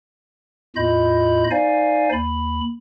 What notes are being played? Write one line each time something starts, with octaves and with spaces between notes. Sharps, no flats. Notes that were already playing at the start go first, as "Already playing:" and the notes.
E2 A2 F4 D#5 B5 G6
D#4 C5 D5 F5 G#5
D#2 B5